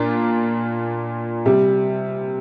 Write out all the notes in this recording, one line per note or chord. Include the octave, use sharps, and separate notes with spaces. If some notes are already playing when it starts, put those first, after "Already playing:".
Already playing: A#2 A#3 D4 F4
C3 G3